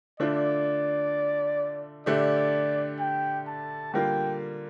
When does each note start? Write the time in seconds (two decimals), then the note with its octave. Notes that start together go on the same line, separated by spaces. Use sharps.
0.20 D3 A3 D4 F4 D5
2.06 D3 A3 D4 G4 D5
2.99 G5
3.47 A5
3.94 D3 G3 A#3 F4 G5